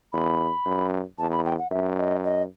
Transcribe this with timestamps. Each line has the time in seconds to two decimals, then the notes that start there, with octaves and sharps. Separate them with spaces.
0.13 E2 B5
0.66 F#2
1.18 E2 A5
1.32 B5
1.45 G5
1.58 F#5
1.71 F#2 E5
1.98 D#5
2.24 D#5